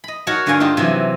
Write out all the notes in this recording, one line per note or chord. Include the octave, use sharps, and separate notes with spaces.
D#5 B5
D#4 F#4 A#4 C#5 A5
G2 D3 A#4 F5 G#5
D#4 F4 G4 A5
C3 E3 F#3